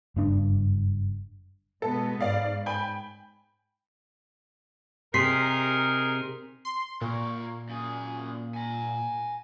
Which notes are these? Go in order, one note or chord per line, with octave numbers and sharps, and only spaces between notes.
F#1 G2 D4
B2 G#3 B3 A4
G#2 D5 F5
G5 G#5 B5
C3 D#4 G#4 A#4 C6 B6 C7
C6
A#2 A#4 C#5
F#2 G#4
G#5 A#5